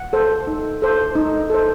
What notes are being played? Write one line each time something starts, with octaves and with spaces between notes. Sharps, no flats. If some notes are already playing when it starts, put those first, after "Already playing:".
Already playing: F#5
A4 C5
D#4
A4 C5
D#4
A4 C5